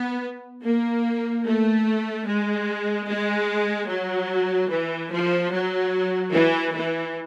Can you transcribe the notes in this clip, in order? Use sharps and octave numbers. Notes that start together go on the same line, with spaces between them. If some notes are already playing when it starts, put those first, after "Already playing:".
Already playing: B3
A#3
A3
G#3
G#3
F#3
E3
F3
F#3
E3
E3